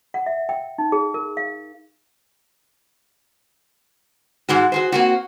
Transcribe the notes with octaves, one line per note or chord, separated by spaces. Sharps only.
F#5
E5
G5
D#4
G#4
A#4
F5
G#2 G#3 F#4
F#4 G#4 C5
A#3 C4 F#4